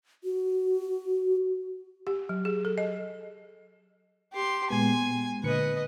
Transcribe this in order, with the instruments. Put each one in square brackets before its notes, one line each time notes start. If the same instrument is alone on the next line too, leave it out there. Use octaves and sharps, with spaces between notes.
[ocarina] F#4
[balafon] G4
F#3
G#4
A4
D#5
[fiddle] G4 C6
[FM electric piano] A#2 G#3 B3 [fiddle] G#5
[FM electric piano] A#2 D3 C#7 [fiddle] B4 D#5